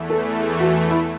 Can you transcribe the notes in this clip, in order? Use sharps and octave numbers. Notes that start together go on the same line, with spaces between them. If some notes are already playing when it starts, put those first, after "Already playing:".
Already playing: E2 E3 A3
A4
F#4
E4